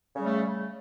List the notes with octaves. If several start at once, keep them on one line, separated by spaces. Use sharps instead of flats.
C#3 G3 A3